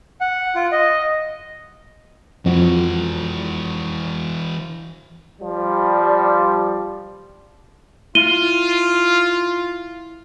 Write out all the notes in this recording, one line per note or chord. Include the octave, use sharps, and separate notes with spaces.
F#5
F4
D#5
F2 E3 F#4
F3 G3
E4 F4 D#7 G7